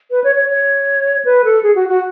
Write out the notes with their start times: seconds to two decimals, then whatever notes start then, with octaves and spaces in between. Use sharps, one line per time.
0.11 B4
0.24 C#5
0.36 C#5
0.49 C#5
1.25 B4
1.44 A4
1.63 G#4
1.75 F#4
1.89 F#4